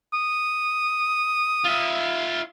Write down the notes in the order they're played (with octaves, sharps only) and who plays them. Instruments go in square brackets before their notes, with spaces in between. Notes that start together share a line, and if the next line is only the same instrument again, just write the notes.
[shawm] D#6
[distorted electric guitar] F4 E5